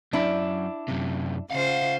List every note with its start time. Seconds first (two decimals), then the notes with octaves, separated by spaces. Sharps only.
0.13 F#2 D4 E4
0.88 F#2 C3
1.50 C#3 F4 C5 F5 F#5